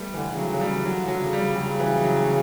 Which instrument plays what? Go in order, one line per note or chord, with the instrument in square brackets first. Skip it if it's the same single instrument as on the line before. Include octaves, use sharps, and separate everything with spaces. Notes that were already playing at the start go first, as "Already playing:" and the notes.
Already playing: [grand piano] G3 A3 B3
[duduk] D3 [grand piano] E3
[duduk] C#3
[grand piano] F#3
[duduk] C#3 [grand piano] F#3
[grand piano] G3
[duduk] C#3
[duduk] D3 [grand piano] F#3
[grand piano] F#3
[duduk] C#3
[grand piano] G3
[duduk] C#3 [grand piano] F#3
[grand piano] E3
F#3